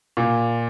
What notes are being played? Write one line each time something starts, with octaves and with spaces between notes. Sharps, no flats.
A#2